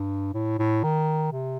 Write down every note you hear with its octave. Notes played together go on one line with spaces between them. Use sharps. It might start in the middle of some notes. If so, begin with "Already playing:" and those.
Already playing: G2
A2
A2
D#3
C3